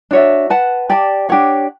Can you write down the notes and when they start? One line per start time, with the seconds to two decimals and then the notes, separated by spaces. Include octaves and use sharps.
0.11 D4 F#4 C#5 E5
0.50 B4 F#5 A5
0.90 G4 D5 A5
1.29 D4 G4 C#5 F#5